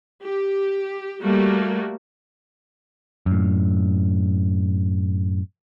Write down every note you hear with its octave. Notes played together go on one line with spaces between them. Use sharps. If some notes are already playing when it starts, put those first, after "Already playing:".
G4
G3 A3 A#3 F#4
F#2 A2